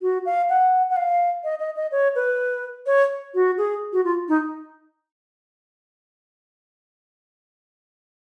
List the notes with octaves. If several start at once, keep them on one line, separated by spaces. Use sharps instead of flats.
F#4
F5
F#5
F#5
F5
D#5
D#5
D#5
C#5
B4
C#5
F#4
G#4
F#4
F4
D#4